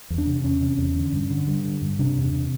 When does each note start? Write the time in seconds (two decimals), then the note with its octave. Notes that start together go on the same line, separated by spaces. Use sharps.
0.10 E2
0.18 D4
0.27 C3
0.43 E2 C#4
0.61 C3
0.78 E2
0.96 D3
1.13 G2
1.30 D3
1.47 G2
1.64 D3
1.82 G2
1.99 C3 D4
2.16 E2
2.24 D4
2.33 C3